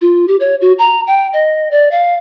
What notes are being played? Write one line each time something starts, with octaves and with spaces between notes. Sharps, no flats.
F4
G4
C#5
F#4
A#5
G5
D#5
D5
F5